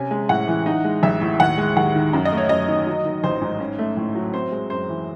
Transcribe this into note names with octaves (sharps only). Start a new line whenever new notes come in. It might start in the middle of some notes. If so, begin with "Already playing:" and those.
Already playing: C3 C#4 G#5
G#3
A2 F#5
E3
D#4
G#3
A1 E5
A2
D#2 F#5
G#3
D#2 F#5
D#3
F#2
D#5
A3
C#5
F#2 D#5
D#3
F#3
D#3
A1 C5
G#2
C#4
A3
A2
F#3
C4 C5
G#3
F#2 C5
E3